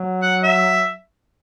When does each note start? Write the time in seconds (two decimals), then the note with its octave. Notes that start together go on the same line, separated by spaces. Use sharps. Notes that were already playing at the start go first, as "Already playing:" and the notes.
Already playing: F#3
0.22 F#5
0.43 E5